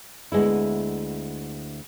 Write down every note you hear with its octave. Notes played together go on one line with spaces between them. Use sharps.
D2 G#3 B3 E4